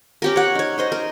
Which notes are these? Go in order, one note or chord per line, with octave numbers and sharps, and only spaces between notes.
C#4 G4 A#4
C#5 F#5
D#4 C#5
D#4 C5 D#5
A#4